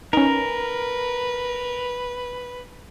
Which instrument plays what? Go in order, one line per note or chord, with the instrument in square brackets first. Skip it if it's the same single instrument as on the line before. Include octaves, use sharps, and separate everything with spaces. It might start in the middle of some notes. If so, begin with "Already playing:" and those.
[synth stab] C#4 D#4 [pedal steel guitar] A#4 [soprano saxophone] B4